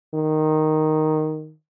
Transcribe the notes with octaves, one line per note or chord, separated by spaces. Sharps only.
D#3